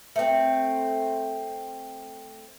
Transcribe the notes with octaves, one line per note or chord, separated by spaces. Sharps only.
A3 C4